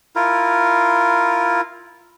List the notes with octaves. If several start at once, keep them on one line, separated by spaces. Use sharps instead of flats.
E4 F4 A#4